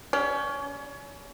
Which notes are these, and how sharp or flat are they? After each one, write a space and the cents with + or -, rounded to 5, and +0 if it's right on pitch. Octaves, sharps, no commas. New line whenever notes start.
G3 -5 C#4 +25